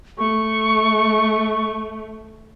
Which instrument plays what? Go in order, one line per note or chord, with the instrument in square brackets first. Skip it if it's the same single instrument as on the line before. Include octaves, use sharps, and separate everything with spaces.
[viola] A3 [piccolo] C#6